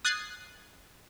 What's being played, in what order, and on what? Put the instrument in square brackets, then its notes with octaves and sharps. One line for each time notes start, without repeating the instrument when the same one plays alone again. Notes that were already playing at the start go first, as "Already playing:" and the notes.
[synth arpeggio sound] D#6 F#6 G#6 A6 C7